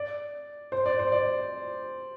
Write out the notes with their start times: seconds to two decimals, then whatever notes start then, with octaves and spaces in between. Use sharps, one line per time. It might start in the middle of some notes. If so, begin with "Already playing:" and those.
Already playing: D5
0.72 C5
0.86 D5
0.99 C5
1.12 D5